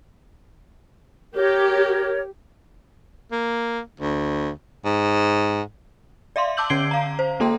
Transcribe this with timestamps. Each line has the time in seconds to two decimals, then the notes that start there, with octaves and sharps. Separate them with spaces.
1.35 G4 A#4 C#5
3.32 A#3
4.00 D2
4.85 G#2
6.36 D5 E5 F5 C6
6.57 A5 D6 E6 G6 F#7
6.70 D3 C#4 G#6 C7 D7 G7
6.91 F5 A#5
7.19 C5
7.40 G#3 A#3 A4 G5 A#5 C6